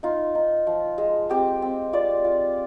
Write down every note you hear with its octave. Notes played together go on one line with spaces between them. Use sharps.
D#4 F4
D#4
F3
G#3
C4 G4
C4
F4 D5
F4